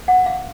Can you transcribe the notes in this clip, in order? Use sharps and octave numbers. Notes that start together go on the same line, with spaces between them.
F#5
F5